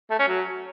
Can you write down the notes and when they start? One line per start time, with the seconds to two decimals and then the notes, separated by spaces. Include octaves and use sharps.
0.11 A3
0.19 C#4
0.28 F#3